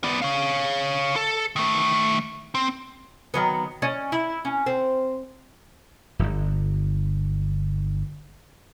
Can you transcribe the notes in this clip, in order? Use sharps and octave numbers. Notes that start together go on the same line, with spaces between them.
B3 D5
C#5 F5
A4
D#3 A3
C4
D#3 F#3 B3
C#4 D5 D#5
E4
C#4
C4
D1 G1